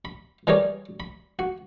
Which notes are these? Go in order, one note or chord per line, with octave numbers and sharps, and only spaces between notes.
B5
E3 G3 G#4 A#4 C#5 D5
B5
F#4